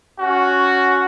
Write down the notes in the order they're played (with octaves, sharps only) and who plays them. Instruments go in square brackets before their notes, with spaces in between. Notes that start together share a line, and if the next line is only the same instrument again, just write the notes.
[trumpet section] C#4 F#4